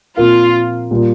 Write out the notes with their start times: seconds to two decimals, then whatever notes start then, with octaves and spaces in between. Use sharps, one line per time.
0.17 A#2 F3 C4 F4 A#4
0.91 A#2 G3 A#3 F4